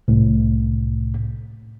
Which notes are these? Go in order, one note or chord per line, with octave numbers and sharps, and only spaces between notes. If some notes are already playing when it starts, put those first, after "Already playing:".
C2 A2